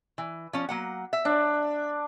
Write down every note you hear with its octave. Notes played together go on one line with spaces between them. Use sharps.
E3
F3 C#4
F#3 A#3 F#5
E5
D4